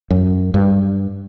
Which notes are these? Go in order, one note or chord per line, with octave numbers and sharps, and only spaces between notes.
F#2
G2